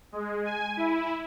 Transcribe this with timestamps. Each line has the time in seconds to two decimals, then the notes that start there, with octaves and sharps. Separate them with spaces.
0.12 G#3
0.45 G#5
0.77 E4